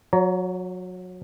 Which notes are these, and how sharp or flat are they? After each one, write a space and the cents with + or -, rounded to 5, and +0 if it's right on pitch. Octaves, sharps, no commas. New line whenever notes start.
F#3 -25 C#5 +35 A#5 +0